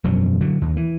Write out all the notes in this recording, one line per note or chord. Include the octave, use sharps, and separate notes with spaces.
E1 F#2 F3 F#3
D3 F#3
D#2
E3